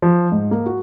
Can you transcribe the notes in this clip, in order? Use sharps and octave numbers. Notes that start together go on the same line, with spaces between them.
F3
G#2
A#3
F#4